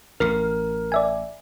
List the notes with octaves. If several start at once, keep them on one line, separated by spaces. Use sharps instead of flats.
A1 A2 A#4 F6
D5 E5 G#5